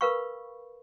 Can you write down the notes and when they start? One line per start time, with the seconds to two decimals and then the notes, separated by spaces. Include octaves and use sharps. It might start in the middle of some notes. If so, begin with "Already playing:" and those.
0.01 A#4 B4 F5 B5 C#6